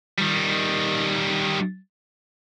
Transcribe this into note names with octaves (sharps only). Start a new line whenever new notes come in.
D#3 G3